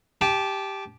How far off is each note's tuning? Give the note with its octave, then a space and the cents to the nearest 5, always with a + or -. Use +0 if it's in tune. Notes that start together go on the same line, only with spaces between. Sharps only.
G4 +0 A5 -25